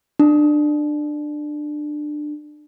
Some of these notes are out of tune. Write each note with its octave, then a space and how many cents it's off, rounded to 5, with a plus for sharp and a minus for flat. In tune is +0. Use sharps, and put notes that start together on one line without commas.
D4 +20